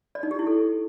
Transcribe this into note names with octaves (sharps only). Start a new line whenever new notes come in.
D5
D#4
G4
E4
A4